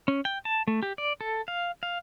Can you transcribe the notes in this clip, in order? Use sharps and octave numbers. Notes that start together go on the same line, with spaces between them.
C#4
G5
A5
A3
G4
D5
A4
F5
F5